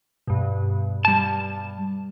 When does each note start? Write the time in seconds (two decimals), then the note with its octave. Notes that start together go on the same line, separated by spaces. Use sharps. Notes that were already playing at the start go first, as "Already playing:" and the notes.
0.27 G2 B2
1.05 G3 A5